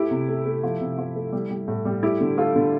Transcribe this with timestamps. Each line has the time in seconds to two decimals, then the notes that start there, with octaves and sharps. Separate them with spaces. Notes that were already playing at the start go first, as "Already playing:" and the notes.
Already playing: A3 E4 G4
0.11 C3
0.28 A3
0.45 A3
0.63 F3
0.81 C3
0.98 F3
1.16 A3
1.32 G3
1.50 G3
1.68 A2
1.85 G3
2.02 A3 E4 G4
2.20 D3
2.37 A3 F4 A4
2.56 D3